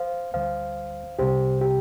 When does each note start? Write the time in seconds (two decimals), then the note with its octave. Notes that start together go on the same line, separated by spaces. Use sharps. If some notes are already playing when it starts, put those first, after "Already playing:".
Already playing: C5 F5
0.34 D2 D3 G3 C5 F5
1.19 C2 C3 G3 G4 C5
1.61 G4